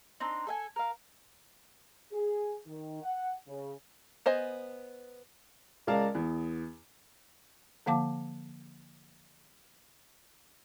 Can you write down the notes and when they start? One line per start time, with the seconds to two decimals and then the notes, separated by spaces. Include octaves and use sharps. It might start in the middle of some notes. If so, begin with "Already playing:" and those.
0.20 C4 D4 D#4
0.47 A4 E5 G#5
0.76 A#4 F5
2.12 G#4
2.66 D#3
3.03 F#5
3.47 C#3
4.26 B3 C5 D#5 G#5
5.87 C#2 G#3 A#4 D5 F5 A5
6.15 E2
7.86 D3 F3 A#3 F5 A5 D6